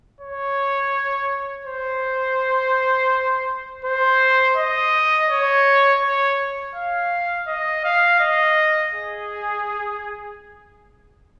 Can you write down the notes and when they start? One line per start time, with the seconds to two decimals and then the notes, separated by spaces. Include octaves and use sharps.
0.20 C#5
1.65 C5
3.85 C5
4.57 D#5
5.30 C#5
6.02 C#5
6.75 F5
7.47 D#5
7.84 F5
8.20 D#5
8.94 G#4